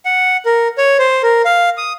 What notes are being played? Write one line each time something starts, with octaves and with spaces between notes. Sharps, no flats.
F#5
A#4
C#5
C5
A#4
F5
D#6